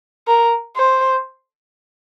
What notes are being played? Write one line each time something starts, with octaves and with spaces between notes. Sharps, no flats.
A#4
C5